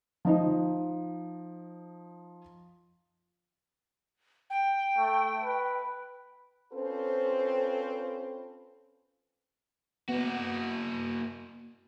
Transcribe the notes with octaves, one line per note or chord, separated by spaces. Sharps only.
F3 D#4 D#5
G5
A3
B4
C4 C#4 F4 A4 B4 C5
A#3 B3 F#4